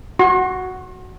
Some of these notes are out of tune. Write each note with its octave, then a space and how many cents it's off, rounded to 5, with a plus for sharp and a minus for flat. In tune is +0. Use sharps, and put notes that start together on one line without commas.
F#4 +0 C6 +45